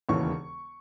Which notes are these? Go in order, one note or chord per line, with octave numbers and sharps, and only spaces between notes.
E1 D#2 C#3 E3 C#6